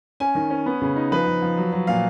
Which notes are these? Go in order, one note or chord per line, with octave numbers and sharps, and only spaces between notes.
C#4 G#5
D#3
C#4
B3
C#3
D#4
F3 B4
F3
F3
F#3
F#3
A#2 F5